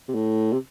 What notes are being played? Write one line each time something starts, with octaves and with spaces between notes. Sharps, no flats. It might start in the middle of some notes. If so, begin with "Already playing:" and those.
C3
A2
C3